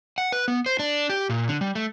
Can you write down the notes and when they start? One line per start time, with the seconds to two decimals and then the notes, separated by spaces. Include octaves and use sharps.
0.18 F#5
0.32 B4
0.48 B3
0.66 C5
0.79 D4
1.09 G4
1.29 A#2
1.48 D3
1.61 G3
1.75 A3